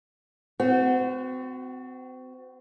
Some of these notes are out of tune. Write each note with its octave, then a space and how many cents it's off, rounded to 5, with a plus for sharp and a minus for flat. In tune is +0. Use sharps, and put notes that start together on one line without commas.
C4 -35 F#4 +5